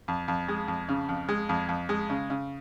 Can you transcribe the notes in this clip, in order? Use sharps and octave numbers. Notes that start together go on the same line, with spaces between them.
F2
F2
G#3
F2
C#3
F2
G#3
F2
F2
G#3
C#3
C#3